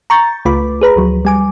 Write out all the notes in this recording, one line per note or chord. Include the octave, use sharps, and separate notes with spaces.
A#5 C#6 G6 A6
C#2 A3 F4 B4 B5 D6
G#4 B4 A#5 B5
D2 F3 F#3
G3 G#5 D6